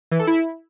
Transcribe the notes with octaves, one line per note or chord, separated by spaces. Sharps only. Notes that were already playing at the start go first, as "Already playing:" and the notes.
E3
A4
E4